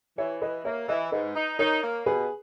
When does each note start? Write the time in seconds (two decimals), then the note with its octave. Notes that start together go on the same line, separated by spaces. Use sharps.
0.18 E3 C#5 E5
0.42 E3 B4 D#5
0.65 A#3 C#5 E5
0.88 E3 B4 D#5
1.12 G#2 B4 D#5
1.35 D#4
1.59 D#4 A#4 C#5
1.83 A#3
2.06 B2 G#4 B4